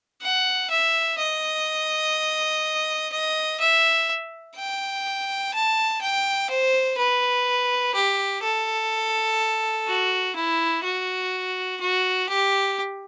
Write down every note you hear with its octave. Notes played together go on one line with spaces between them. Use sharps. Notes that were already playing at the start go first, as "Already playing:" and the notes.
F#5
E5
D#5
D#5
E5
G5
A5
G5
C5
B4
G4
A4
F#4
E4
F#4
F#4
G4